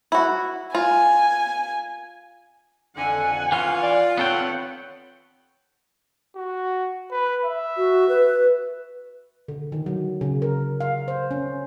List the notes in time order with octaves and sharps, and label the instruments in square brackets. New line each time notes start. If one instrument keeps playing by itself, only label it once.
[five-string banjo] E4 F#4
[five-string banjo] F4 [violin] G#5
[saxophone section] F2 D3 [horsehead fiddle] F#5 G#5
[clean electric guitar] E3 C#4 [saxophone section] F4
[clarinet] D5
[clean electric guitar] B3 A4 G5 [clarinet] C4 [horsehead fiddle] C#5 F#5
[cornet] F#4
B4
E5
[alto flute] F#4
B4
[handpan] D3
D#3
F#3
C#3
A#4
F5
C5
C#4